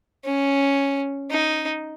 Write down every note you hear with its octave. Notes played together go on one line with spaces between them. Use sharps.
C#4
D#4